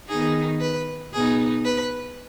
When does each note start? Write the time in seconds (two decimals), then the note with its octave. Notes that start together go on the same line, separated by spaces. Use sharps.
0.09 D#3 B3 D#4 G#4
0.61 B4
1.13 B2 B3 D#4 G#4
1.65 B4